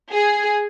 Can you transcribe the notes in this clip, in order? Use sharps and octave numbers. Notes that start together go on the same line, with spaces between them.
G#4